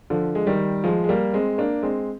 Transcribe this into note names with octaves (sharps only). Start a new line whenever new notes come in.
D3 F3
G#3
D#3 G3
F3 G#3
G#3
G3 A#3
G#3 C4
A#3 D4
G#3 C4